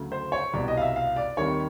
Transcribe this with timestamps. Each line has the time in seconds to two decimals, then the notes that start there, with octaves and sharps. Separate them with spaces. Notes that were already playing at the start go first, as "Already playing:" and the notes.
Already playing: D2 C#3 F#3 A3
0.12 C5
0.32 C#5
0.53 C2 B2 G3 D5
0.68 D#5
0.77 F5
0.82 E5
0.96 F5
1.16 D5
1.37 D#2 D#3 G3 C4 C#5